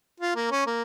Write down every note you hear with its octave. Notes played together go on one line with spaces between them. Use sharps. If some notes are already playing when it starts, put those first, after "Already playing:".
F4
A#3
C#4
A#3